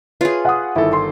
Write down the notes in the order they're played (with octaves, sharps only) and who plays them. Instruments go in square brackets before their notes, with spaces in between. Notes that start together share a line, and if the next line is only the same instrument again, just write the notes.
[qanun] F4 G#4 [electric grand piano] B4 C#5
[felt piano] F#5 D#6
[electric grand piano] G1 D#3 A4 [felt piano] E4
[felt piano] C6